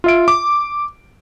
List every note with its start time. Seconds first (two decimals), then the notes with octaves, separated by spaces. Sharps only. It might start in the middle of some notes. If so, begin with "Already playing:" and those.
0.04 F4 E5 D7
0.28 D6